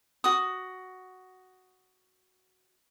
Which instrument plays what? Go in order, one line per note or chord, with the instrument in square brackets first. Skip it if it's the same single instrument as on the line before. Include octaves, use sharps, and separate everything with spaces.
[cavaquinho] F#4 D#6